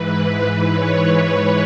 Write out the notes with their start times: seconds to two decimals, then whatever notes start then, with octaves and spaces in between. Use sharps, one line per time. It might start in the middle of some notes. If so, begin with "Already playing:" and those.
Already playing: G#2 E3 B4
0.73 C#5